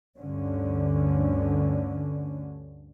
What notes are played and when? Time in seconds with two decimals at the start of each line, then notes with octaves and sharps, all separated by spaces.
0.18 D2 G2 D3 C#4